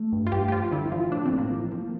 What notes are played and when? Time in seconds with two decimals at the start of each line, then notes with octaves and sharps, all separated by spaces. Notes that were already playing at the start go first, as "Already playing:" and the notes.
Already playing: A3
0.12 G2
0.27 F4
0.32 G2 G4
0.48 G4
0.52 F3 F4
0.72 D3 E4
0.92 F3 F4
1.12 A2 D4
1.26 C4
1.33 A2
1.38 A#3
1.52 F3
1.72 F3